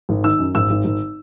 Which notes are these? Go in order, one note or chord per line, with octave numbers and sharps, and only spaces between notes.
G#1
D#3 E6
F#2
G#1 E6
G#1
G#1